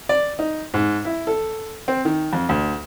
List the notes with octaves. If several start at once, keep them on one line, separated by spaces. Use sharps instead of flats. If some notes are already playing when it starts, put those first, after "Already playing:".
D5
D#4
G#2
E4
A4
C4
D#3
F2
D2